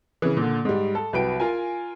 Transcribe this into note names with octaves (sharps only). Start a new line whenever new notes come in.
C#3 E3
A#2 D3
G#2 G3
A4
C2 F#3 B4 G5 D7
F4 A#4 G#5